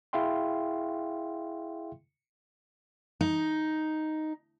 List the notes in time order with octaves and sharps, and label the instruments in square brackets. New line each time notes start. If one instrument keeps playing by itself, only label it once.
[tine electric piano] E4 G#4 E5 F5 G5 C6
[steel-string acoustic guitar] D#4